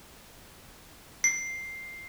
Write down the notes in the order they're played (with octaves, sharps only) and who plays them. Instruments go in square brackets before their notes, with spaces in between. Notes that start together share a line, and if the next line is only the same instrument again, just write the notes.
[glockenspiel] C7